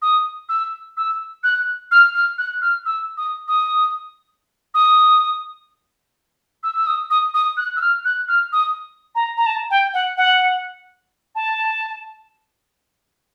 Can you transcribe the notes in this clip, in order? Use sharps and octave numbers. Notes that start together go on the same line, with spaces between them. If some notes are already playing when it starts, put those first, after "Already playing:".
D#6
E6
E6
F#6
F6
F6
F#6
F6
E6
D#6
D#6
D#6
E6
E6
D#6
D#6
D#6
F#6
E6
F6
F#6
F6
D#6
A#5
A#5
A5
G5
F#5
F#5
A5